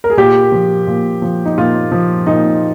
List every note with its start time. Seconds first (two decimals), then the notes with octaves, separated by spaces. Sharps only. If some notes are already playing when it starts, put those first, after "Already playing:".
0.04 A#4
0.10 G#4
0.17 A#2 G4
0.52 F3
0.87 A#2
1.22 F3
1.46 D#4
1.58 A#2 F4
1.92 F3
2.27 A#2 D#4